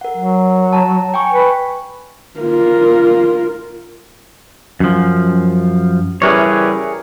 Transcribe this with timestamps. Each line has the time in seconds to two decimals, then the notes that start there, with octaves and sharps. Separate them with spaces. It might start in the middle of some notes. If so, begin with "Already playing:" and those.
0.01 A#4 F#5
0.17 F#3
0.73 A5 A#5
1.14 G5 G#5 C#6
1.33 B4
2.40 F4 A#4
4.80 F#2 F3
6.22 C#3 E3 G3 G#4 A#4 C#5